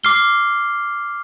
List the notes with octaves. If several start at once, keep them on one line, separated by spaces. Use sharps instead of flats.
D6 F6 C7 G7